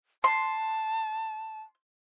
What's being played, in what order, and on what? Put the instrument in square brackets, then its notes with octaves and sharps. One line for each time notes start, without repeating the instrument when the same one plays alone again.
[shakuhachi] A5 [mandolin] C6